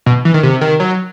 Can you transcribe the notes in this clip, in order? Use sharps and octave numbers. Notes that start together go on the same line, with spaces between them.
B2
E3
D#3
C3
D#3
F#3